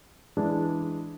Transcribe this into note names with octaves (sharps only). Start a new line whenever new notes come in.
E3 G#3 D4 E4